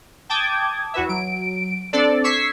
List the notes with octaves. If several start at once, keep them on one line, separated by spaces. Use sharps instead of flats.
G5 A5 D6 D#6 G#6
E2 F#4 B4 E5
F#3 D7
C4 D4 A4 D5
C#6 E6 G#6 B6 C7